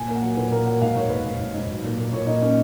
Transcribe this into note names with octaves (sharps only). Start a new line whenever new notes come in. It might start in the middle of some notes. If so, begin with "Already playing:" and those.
Already playing: A#2 G#5
A#3
F#5
F#3
A#2 B4
A#3 A#4
F#3 F#5
G#2 F5
G#2 C#5
G#2 B4
G#2
G#2
G#2
F#3
A#2
A#3
A#2 C#5
A#2 D#4
A#3 C#4